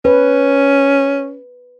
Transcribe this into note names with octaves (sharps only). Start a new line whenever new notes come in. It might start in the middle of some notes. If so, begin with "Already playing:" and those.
C#4 B4